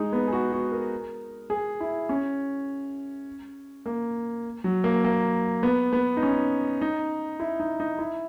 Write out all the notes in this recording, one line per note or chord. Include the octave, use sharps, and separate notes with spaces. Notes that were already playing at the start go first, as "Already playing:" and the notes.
Already playing: G#3 D#4
B3
G#4
F#4
F#4
A#4
G#4
E4
C#4
A#3
F#3
A#3
A#3
B3
B3
D#4
C#4
D#4
E4
D#4
D#4
E4